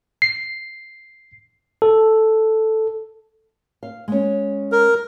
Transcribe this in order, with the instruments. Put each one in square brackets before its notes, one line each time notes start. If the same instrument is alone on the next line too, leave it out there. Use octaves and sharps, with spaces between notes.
[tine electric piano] C7
A4
[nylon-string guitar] F5
G#3 C#4
[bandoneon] A#4